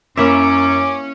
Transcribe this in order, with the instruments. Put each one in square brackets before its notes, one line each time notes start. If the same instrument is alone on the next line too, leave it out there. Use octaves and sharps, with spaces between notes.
[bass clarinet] F#2 [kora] A#3 E4 E5 [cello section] C#4 [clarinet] D6